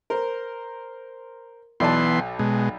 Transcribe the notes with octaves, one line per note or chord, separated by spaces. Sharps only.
A#4 C5
B1 E3 B3 D5 A5 C6
B2 G#3